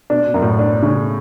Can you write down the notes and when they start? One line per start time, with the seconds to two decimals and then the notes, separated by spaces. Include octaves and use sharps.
0.10 B2 D4
0.27 B2
0.34 F#2
0.42 A2
0.59 D4
0.83 C#3